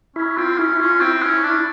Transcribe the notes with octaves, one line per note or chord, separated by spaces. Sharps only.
C#4 E4
C4 F4
C#4 E4
C#4 F4
C4 E4
C#4
E4
D4